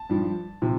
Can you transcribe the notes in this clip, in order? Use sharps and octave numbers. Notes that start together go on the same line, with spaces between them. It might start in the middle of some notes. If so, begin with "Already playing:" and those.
Already playing: A5
G2 F3
C3 F3